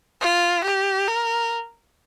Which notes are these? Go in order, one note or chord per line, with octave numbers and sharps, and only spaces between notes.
F4
G4
A#4